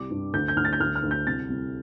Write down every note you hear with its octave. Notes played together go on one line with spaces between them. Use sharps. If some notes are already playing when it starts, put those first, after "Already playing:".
Already playing: C2 G3 D6
G2
D2 G6
G6
D2 F6
A6
G6
D2 F6
F6
D2
G6
C2 A6
C2